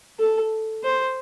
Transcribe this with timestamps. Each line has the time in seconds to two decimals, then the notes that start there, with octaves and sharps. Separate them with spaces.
0.20 A4
0.84 C5